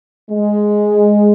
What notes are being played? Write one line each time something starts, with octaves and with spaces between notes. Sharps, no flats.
G#3